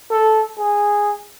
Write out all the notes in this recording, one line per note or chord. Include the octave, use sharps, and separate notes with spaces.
A4
G#4